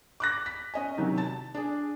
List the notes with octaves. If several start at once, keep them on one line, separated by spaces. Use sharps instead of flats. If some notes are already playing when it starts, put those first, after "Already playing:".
D6 F#6 A#6
B6
C#4 D#5 G#5
C3 D#3 F#3
A5 A6
D4 G#4